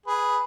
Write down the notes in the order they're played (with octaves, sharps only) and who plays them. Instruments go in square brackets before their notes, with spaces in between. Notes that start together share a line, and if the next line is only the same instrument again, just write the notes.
[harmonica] G#4 B4